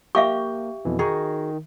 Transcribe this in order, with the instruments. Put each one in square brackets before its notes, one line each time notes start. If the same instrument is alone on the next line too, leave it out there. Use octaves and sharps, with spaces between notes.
[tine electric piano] A#3 [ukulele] G4 [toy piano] E5 F5 C#6
[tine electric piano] F2 B2 E3
[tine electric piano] D#3 [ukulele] D#4 F#4 G#4